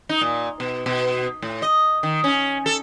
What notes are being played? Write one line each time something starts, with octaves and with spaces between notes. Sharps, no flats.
D#4
A#2
B2
B2
A2
D#5
D#3
C#4
A4